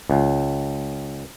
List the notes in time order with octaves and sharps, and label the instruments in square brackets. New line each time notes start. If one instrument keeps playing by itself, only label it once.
[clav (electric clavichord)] C#2